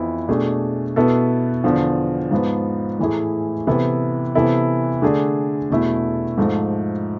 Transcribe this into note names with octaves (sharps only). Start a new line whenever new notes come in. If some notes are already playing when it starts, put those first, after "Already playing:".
Already playing: F2 E3 B3 E4
B2 A3 D4 G#4
B2 B3 E4 A4
E2 D3 F3
G#2 F3 B3
A2 E3 A3 E4 G#4
C3 E3 B3 E4 A4
C3 E3 B3 E4 A4
D3 A3 D4 G#4
E2 B2 A3 E4 A4
G#2 F3 A3